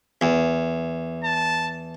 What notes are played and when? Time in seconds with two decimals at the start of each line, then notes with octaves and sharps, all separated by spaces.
0.21 E2
1.24 A5